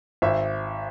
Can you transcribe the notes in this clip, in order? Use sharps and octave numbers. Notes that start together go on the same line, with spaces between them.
G#1 E5